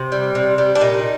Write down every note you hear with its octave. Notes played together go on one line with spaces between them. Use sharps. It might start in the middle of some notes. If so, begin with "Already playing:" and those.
Already playing: C3
G3
C3
G3
D4
A#2 D#4